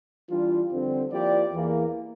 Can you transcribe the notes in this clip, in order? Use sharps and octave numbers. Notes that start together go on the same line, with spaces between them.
E3 G3 D4 F4
F2 D3 G3 C4
F3 A#3 E4 G4 D5
E2 E3 A#3